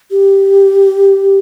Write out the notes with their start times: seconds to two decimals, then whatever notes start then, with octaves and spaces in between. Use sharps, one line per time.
0.11 G4